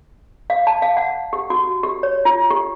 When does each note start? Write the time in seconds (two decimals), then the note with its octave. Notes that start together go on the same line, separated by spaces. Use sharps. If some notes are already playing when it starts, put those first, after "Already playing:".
0.50 F5
0.67 A5
0.82 F5
0.97 F#5
1.33 G4
1.50 F#4
1.83 G4
2.03 C#5
2.25 F4
2.51 G4